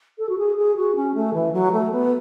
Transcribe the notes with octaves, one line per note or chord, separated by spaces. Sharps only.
A4
F#4
G#4
G#4
F#4
C#4
A3
E3
F#3
A3
B3